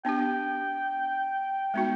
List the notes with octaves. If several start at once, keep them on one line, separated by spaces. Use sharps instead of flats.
B3 D4 G4 G5
G#3 B3 D#4 F#4